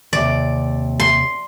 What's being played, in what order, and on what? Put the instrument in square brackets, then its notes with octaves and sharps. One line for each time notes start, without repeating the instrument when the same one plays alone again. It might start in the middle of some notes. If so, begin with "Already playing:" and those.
[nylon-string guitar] D#2 C3 [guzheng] D5
[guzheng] C6